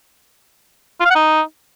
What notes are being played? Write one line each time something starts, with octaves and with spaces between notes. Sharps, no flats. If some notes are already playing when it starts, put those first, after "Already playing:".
F4
F5
F#5
D#4